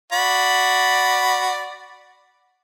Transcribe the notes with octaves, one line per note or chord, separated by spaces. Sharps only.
F#4 D5 B5